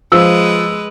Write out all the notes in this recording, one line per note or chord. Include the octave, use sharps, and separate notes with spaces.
F3 G#3 B4 E6